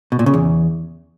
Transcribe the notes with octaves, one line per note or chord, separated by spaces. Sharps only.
B2
A#2
C#3
E2